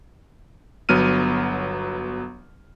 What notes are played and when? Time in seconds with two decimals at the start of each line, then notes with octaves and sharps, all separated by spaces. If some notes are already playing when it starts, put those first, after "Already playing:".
0.89 G1 F#3 B3 F6 D#7